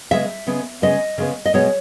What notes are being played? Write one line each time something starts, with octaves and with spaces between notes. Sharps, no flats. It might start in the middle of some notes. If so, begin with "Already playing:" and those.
C#3 G#3 B3 E5
C#3 G#3 B3
C#3 G#3 B3 D#5
C#3 G#3 B3
D#5
B2 G#3 B3 C#5